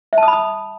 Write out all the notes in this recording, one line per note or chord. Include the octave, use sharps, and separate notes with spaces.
E5
A5
D#6
B5
D#6